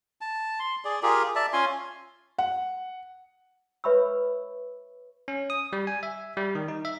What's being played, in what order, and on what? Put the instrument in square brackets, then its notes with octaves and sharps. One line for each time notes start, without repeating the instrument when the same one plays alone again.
[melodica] A5
C6
G#4 D5
F4 G4 G#4 A#4
D5 E5 A5
C#4 F4 G#5 C6
[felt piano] F#5
[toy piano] B4 C#5 E5 B5 C#6 E6
[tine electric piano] C#4
D#6
G3
G#5
E5
G3
D#3
D#4
E5